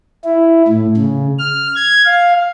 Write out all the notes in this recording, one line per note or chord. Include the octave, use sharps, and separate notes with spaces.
E4
A2
C#3
F6
G#6
F5